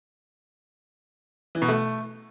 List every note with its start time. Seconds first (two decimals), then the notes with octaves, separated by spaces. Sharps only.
1.55 E3
1.62 B2
1.68 A3